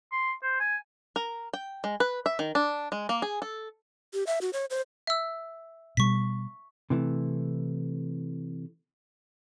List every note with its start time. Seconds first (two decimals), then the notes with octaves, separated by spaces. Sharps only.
0.12 C6
0.43 C5
0.60 G#5
1.16 A#4
1.53 G5
1.84 G#3
2.00 B4
2.26 E5
2.39 D#3
2.55 D4
2.92 G#3
3.09 A#3
3.22 G#4
3.42 A4
4.14 G4
4.27 E5
4.41 F#4
4.53 C#5
4.70 C5
5.07 E5 E6
5.97 B2 G3 C#6 B6
6.90 C3 E3 A3